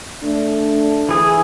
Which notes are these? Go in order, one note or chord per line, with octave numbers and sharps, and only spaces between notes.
A3 D4
E3 G#4